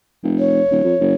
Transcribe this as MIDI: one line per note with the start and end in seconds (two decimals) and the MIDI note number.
0.24 0.61 29
0.39 1.15 73
0.71 0.82 27
0.84 0.95 41
1.00 1.14 30